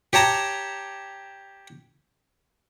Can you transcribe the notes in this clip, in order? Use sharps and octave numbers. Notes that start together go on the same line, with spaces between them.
G4 C#5 A5 A#5